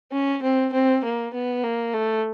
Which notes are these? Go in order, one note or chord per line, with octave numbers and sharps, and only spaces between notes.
C#4
C4
C4
A#3
B3
A#3
A3